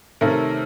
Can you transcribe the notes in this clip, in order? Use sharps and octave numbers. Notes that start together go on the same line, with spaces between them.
C3 D#3 A3 C#4 A#4